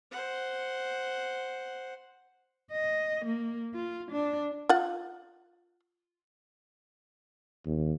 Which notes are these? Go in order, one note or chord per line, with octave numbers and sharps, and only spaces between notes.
C5 F#5
D#5
A#3
F4
D4
F4 F#5
D#2